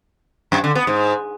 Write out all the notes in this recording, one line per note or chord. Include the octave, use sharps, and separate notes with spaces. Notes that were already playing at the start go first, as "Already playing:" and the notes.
F#2
D3
B3
G#2